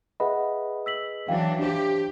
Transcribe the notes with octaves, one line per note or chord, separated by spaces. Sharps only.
G#4 B4 D#5 E5 F#5 B5
E6 B6 F#7
E3 F#3 D4 F5 G5
D4 G4 C5